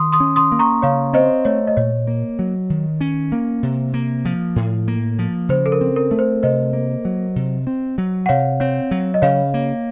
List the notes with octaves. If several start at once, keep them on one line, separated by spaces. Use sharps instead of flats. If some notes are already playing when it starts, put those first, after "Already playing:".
Already playing: D#3 C6 D#6
C6 D#6
C#4
C6 D#6
A#3
A#5 C#6
C#3 C#5 F5
C4 C5 D#5
A3 C#5
D#5
A#2 C#5
A#3
F#3
D#3
C#4
A#3
C3
A#3
F3
A2
A#3
F3
C#3 C5
A4
A#4
C4
A#4
A3
C5
C3 C5 D#5
A#3
F#3
C3
C4
F#3
F#5
C3 C#5 F5
C4 C#5
F#3
D#5
C#3 C#5 F5
A#3